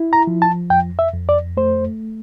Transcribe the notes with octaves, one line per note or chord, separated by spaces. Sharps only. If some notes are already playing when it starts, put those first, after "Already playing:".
Already playing: E4
A#5
F3
A5
F2 G5
E5
F2
D5
A3 C5